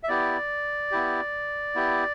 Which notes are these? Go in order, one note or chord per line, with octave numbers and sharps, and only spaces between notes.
E5
B3 E4 G4 D5
B3 E4 G4
B3 E4 G4